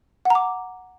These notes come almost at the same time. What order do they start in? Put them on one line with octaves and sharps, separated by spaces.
F#5 A#5 D6